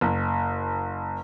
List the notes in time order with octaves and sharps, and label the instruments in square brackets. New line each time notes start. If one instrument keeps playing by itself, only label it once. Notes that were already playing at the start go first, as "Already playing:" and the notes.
[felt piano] F#1